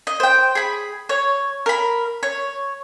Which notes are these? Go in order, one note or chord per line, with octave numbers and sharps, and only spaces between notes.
D#5
C5 G5
G#4 B5
C#5
A#4 B5
C#5